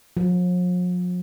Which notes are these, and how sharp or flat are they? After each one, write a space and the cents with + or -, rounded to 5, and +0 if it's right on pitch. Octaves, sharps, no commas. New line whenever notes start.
F3 +45